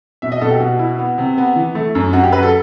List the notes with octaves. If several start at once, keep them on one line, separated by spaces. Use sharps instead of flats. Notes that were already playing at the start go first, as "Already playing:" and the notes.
B2 E5
D#5
B2 A4
G4
B2 F#4
E4
B3
C3
B3
E3
A3
F#2
F#2 F#4
G4
F#3 B4
A4